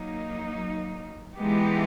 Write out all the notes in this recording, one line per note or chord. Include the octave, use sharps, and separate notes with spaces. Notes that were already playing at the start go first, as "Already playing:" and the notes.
Already playing: F#3 A#3 D#4
E3 G#3 B3 D#4 G4